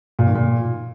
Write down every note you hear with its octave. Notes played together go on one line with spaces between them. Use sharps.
A#2
D#3
A#2